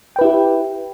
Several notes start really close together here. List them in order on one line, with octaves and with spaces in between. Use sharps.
G5 B4 E4 G4